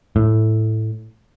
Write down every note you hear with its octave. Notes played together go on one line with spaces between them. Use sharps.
A2